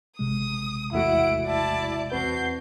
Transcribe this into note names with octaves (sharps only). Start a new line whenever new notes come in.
A1 C3 G#3 D#6
E2 A3 E4 F#4 F#5 D7
E4 D5 A5
E2 C4 F#4 B4 G6 C7